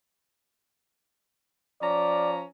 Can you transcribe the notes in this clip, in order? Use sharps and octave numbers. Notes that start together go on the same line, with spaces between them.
F3 C#4 D5 A#5